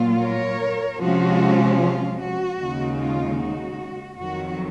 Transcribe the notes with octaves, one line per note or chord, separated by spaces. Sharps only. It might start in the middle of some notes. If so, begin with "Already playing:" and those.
Already playing: A#2 F#3 A#3 F4
A#4 C#5
C3 F3 G#3 C#4 F4 F#4
F4
F#4
D#2 C#3 G#3 D#4
F4
F#4
F2 D#3 F#3 F#4